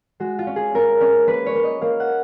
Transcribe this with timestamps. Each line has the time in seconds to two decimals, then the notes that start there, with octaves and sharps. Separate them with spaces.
0.20 G#3 F#4
0.39 F4
0.47 C#4
0.56 G#4
0.74 C#4 A#4
1.01 C#4
1.27 A#3 B4
1.46 C#5
1.55 A#3
1.64 D#5
1.81 A#3 F5
2.00 F#5